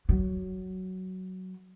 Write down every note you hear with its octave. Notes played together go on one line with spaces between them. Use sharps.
F#3